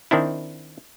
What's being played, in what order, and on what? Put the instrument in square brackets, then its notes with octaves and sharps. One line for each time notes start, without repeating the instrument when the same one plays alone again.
[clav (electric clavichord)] D#3 C4 D4 E4